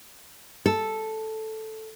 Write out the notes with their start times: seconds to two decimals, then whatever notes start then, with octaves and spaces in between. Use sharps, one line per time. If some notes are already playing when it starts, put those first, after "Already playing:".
0.66 A4